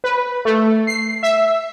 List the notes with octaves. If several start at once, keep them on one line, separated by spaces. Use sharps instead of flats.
B4
A3
C7
E5